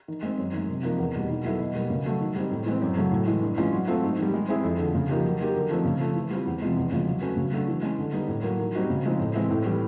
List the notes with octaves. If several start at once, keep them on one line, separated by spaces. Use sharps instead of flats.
D#3
G#3 C4
F#2
D#3 G#3
C3
F3 A#3 D#4
E2
B2 G3
D#3
F#3 B3 E4 A4
B2
G3 A#3
C#3
F#3 A3
D#3
G3 C4 D#4
A2
E3 G#3 C4
F#2
C#3 F#3 A3
A2
E3 G#3
G2
E3 G#3 C#4 F4
F#3
A3 C4 F4
G#2
D#3 G3
G#3
C4 E4 G#4
F2
D3 F3
C#3
F3 A#3 D#4 G4
F#3
A#3 D#4 G4 A#4
D3
F3 A3 C4 D#4
C#3
F3 A3
E3
G3 C4 F4
E2
C3 F3 G#3
E2
C#3 F3 G#3
F#3
A3 C#4 F#4 B4
C#3
F#3 A3 D4
E3
G#3 C#4
D3
G3 B3 D#4
A2
F#3 A#3
D#3
G3 C4 D#4 F#4
C#3
F3 G#3 C4 D#4
A2
E3 G#3 C4 E4
A2
E3 G3